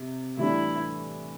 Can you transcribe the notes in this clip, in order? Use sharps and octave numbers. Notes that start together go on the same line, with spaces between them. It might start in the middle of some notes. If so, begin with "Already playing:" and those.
Already playing: C3
A2 E3 G3 D4 E4